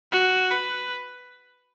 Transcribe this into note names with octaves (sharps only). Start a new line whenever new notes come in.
F#4
B4